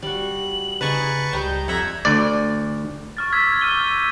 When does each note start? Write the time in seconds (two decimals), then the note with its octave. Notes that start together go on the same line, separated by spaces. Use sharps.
0.03 G3 F#4 F#7
0.81 C#3 D#4 G#4 B4 A5 C#6
1.33 C#2 G3 D#5 A#5 G6
1.68 F2 E5 F#5 A#5 G#6
2.05 D2 D5
3.17 C#6 F6 A6
3.32 D6 E6 F6 G#6 B6
3.61 E6 F6 G6 D#7 G7